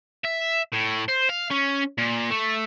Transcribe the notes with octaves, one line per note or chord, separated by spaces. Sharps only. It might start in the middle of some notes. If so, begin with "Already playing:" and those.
E5
A2
C5
F5
C#4
A#2
A3